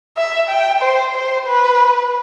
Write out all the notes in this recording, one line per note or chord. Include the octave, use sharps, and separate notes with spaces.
E5
G5
C5
C5
B4